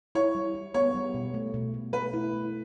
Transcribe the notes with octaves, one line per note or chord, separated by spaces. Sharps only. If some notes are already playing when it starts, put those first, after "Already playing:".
E4 C#5
G3
E4
B3 C#5
G3
B2
A3
B2
A3
A3 B4
E4
A3